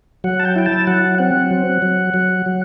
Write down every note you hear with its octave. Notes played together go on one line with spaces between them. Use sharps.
F#3 F#5
A5
G5
E4 G5
A5
F#3 F#5
C4 F#5
F#3
F#3
F#3
F#3